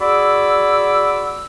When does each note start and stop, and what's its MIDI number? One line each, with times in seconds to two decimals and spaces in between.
0.01 1.46 66
0.01 1.46 68
0.01 1.46 74
0.01 1.46 83
0.01 1.46 86
0.01 1.46 88